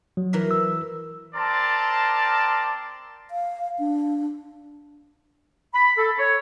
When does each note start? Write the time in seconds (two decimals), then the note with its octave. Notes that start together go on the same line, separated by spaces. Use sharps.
0.17 F#3
0.33 E3 A#4 E5
0.51 E6
1.34 C4 A#4 D5 A5 C6
3.29 F5
3.79 D4
5.74 B5
5.97 A4
6.19 C#5